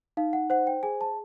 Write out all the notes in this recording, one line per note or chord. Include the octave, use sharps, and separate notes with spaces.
D#4 F5
F#5
C5 F#5
G5
G#4 G#5
A5